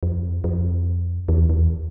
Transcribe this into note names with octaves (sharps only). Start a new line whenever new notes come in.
F2
F2
E2
E2